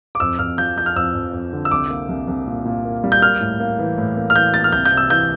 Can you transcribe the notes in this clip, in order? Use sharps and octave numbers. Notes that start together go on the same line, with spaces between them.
D6
F2 E6
F2 F6
F3 G6
F3 G6
F6
F2 E6
F2
F2
D3
E6
C2 D6
A#3
C2
C2
A#2
A#2
A#3
G3
G6
A#3 F6
A2
A#3
E3
A2
A#3
F6
E3 G6
A#3 A6
F6
C2 G6
G6
C3
E6
E3 G6